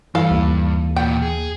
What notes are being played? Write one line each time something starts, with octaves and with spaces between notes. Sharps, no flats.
G2 E3 A4 F5
D#2
A#2 B3 G5
G#4